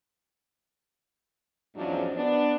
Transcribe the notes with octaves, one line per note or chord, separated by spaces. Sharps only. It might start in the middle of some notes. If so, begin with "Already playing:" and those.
E2 G#2 F3 F#3 C#4 D4
B3 D4